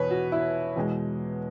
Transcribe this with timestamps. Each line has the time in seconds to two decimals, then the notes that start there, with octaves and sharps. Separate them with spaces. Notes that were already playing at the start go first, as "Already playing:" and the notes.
Already playing: E2 B2 B4 C#5
0.11 F#4
0.32 E4
0.76 E2 B2 G#3